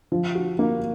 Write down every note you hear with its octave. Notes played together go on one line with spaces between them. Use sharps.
F3
F#4
A#3